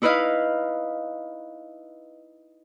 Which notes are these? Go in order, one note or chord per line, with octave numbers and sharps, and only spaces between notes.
D#4 E4 B4 D#5 F5